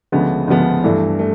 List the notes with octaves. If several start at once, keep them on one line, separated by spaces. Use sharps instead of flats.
D2 C#3 F3 G#3 B3
D2 C#3 F3 G#3 B3
G2 E3 A3
A3